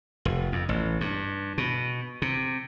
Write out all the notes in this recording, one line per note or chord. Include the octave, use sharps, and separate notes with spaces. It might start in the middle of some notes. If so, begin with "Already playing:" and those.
F1
F2
A1
G2
B2
C3